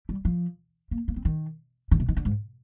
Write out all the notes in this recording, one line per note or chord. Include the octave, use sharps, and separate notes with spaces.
G3
F3
A#3
A#3
C4
D#3
D3
C3
D#3
D3
G#2